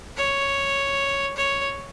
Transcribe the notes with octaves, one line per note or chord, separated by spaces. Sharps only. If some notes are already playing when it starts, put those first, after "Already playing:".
C#5
C#5